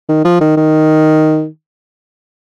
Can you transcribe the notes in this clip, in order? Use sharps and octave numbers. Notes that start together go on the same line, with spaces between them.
D#3
F3
D#3
D#3